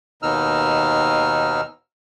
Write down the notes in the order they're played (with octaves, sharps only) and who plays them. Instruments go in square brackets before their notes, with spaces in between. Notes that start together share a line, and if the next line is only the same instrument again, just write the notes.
[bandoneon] D#2 B2 D#3 D#4 E6 F6